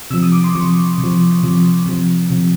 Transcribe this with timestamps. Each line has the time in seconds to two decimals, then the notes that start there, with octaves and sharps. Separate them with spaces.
0.11 C3 E6
0.14 F3
0.22 D#6
0.32 D6
0.44 C6
0.55 C3 F3 C#6
0.98 C3
1.04 F3
1.43 C3 F3
1.86 C3 F3
2.31 C3 F3